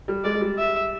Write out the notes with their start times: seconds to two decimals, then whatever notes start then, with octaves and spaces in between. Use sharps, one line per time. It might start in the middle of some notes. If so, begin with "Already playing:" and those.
0.08 G3
0.24 G#3 D5
0.34 G#3
0.41 G3
0.59 E5